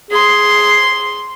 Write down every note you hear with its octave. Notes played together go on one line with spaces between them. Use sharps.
G#4 C6